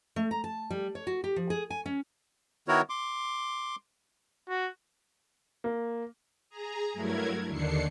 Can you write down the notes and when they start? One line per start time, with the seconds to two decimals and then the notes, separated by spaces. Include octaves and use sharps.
0.16 A3
0.31 A#5
0.44 A5
0.71 G3
0.95 C#5
1.07 F#4
1.24 G4
1.36 F3
1.50 G#4
1.70 G#5
1.86 C#4
2.68 D#3 B3 E4 F#4 A#4 C#5
2.89 C6 D6
4.49 F#4
5.64 A#3
6.50 G#4 A#5
6.93 G2 F#3 A3 E4 A#4 G#6
7.48 D#2 D3 D#3 D4 C7 C#7